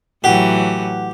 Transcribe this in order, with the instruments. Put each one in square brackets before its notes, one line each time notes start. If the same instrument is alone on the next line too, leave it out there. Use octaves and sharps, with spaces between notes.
[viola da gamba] A2 E3 F#3 [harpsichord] G4 [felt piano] F#5